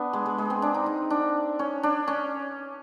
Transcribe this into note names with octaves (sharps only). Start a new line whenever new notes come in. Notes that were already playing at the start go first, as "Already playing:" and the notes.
Already playing: B3 D4
G#3
G#3
G#3
C4
D4
D#4
D#4
D4
C#4
D4
C#4